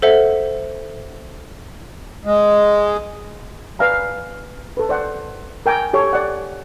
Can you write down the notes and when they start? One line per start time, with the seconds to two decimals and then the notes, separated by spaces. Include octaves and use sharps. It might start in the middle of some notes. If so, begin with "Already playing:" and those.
0.02 A4 C5 E5 F#5
2.25 G#3
3.79 B4 D5 F5 G#5 A#5
4.77 A4 B4
4.89 C5 D5 F#5
5.66 A#4 G5 G#5 A#5 D6
5.93 G4 A4 C#5 G#5
6.13 D5 F#5